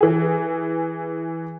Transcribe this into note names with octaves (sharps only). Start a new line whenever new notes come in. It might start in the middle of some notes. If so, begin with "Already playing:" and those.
E3 G#4